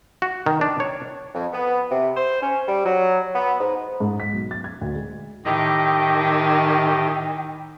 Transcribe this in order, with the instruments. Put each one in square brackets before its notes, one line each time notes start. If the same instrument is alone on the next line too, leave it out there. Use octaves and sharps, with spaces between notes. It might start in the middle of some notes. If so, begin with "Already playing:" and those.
[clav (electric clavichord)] F#4
D#3
D4
C#5
[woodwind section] F2
B3
C3
C5
C#4
G3
F#3
B3
G#2
[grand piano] G#2
B6
B1
A6
G#6
D2
G#3
[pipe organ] A2 G4 D#5 [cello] D#3 [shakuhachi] G5